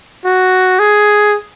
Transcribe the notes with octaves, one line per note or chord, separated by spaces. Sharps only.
F#4
G#4